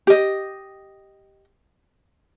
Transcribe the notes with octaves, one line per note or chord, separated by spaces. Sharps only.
G4 D#5